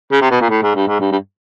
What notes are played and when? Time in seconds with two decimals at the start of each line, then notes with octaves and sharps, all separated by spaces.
0.12 C#3
0.21 C3
0.31 B2
0.41 A#2
0.50 A2
0.63 G#2
0.75 G2
0.87 G#2
1.00 G2
1.12 G2